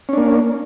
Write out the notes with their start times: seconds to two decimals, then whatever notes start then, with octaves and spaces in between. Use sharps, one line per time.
0.09 C#4
0.13 D4
0.17 A#3